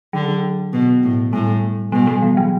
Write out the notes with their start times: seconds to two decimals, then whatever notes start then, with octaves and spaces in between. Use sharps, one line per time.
0.13 D3 F#3
0.73 B2
1.03 A2
1.33 A2 G3
1.92 B2 G3
2.07 G3
2.22 E3
2.37 F#3